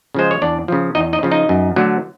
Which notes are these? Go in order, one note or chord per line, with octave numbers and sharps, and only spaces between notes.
C#3 F3 G#3 C5
C#5
E2 D4 D5
C#3 F3
E2 D#4 D#5
D#4 D#5
C#3 F3
D#4 D#5
F#2
D3 F#3 A3